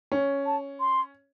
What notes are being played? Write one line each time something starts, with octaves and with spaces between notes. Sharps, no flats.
C#4
A5
C6